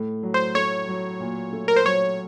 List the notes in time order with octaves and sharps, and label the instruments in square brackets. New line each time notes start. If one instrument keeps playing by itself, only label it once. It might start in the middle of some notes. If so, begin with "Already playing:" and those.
Already playing: [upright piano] A2
F#3
[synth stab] C5
[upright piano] A3 [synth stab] C#5
[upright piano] F#3
A#2
A3
[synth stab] A#4
C5
[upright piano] F#3 [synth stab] C#5